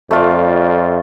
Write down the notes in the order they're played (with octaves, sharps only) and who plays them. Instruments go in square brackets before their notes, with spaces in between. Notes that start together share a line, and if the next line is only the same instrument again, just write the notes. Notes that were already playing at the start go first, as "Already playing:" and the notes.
[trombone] F2 [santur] A3 F4 D5